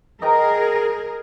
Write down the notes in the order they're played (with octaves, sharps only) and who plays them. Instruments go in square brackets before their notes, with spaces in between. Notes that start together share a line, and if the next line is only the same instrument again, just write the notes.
[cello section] G#4 A#4 [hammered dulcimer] D#5 G5 A#5